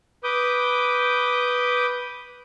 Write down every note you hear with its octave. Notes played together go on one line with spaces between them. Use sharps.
B4 D6 D#6 G6